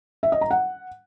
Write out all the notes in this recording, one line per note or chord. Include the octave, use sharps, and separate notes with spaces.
E5
D#5
A#5
F#5